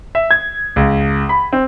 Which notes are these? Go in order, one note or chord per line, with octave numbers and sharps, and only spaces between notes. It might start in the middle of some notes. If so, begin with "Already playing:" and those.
E5
G#6
C#2
B5
C4